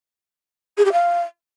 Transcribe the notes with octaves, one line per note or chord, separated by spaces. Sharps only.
G#4
G4
F5